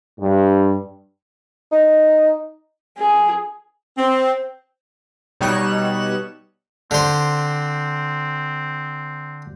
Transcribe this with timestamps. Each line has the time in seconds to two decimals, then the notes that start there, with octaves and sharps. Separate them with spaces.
0.20 G2
1.72 D#4
2.98 G#4
3.98 C4
5.41 B2 G3 D#4 C#5 F#6 E7
6.91 D3 C4 C5